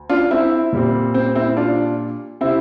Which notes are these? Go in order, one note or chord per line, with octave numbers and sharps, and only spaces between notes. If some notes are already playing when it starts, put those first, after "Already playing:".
Already playing: D2
D4 F4
C4 E4
A#2 G3 C4
C4
C4 E4
D4 F4
C3 C4 E4